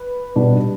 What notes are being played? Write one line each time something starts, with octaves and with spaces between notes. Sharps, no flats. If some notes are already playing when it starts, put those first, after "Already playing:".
Already playing: B4
B2 G3 B3 D4